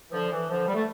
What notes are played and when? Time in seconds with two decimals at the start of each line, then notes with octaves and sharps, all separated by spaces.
0.09 E3
0.12 D3 F3
0.31 E3
0.49 D3 F3
0.68 G3
0.74 A3